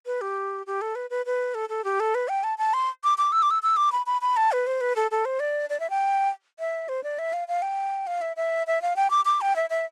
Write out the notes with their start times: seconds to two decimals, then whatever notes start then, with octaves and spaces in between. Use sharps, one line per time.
0.06 B4
0.21 G4
0.66 G4
0.81 A4
0.95 B4
1.10 B4
1.26 B4
1.54 A4
1.69 A4
1.84 G4
2.00 A4
2.15 B4
2.28 G5
2.43 A5
2.58 A5
2.73 C6
3.04 D6
3.18 D6
3.32 E6
3.42 D6
3.50 E6
3.63 E6
3.77 D6
3.92 B5
4.06 B5
4.21 B5
4.36 A5
4.52 B4
4.67 C5
4.81 B4
4.96 A4
5.11 A4
5.25 C5
5.40 D5
5.70 D5
5.80 E5
5.90 G5
6.59 E5
6.88 C5
7.03 D5
7.19 E5
7.33 F5
7.48 F5
7.62 G5
8.07 F5
8.21 E5
8.36 E5
8.67 E5
8.82 F5
8.96 G5
9.10 D6
9.25 D6
9.41 G5
9.56 E5
9.70 E5